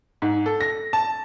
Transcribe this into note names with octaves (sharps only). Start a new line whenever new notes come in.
G#2
A4
A#6
A5